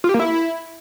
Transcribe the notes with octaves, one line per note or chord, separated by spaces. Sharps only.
F4
G4
A#3
E4